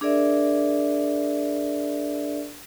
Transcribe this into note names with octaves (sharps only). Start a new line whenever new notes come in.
D4 G#4 A#4 D5 E5